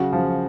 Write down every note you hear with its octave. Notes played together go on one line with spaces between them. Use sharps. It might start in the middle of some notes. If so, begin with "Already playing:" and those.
Already playing: C#3 F#3 F#4 F#5
F3